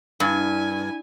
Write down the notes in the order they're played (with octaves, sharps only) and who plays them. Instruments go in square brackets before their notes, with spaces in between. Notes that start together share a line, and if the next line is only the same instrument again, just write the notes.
[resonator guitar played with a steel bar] G2 [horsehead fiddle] E4 G#5